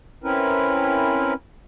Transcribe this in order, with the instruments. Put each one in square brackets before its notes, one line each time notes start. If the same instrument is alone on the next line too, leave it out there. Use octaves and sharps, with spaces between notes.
[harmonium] C4 C#4 E4 A#4 B4